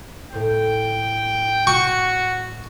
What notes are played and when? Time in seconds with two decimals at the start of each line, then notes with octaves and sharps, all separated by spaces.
0.32 A2 C5 G5
1.67 F#4 C#6